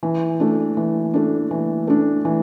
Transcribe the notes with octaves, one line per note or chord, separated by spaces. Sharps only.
E3
A3 D4
E3
A3 D4
E3
A3 D4
E3